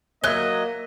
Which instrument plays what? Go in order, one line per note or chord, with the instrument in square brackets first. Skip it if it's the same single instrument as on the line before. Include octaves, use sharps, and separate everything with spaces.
[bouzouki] F#3 [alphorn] A#3 [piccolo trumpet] D#5 [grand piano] E5 F#6 G7